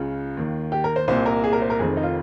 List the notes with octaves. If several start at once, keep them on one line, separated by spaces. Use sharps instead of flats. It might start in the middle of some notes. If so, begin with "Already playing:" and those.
Already playing: C#2 C#3 F4
D#2 D#3
G4
A#4
C5
C2 A#2 C5
A#4
G#4
A#4
C5
A#4
F1 F2 D#3 G#4
D#4
F4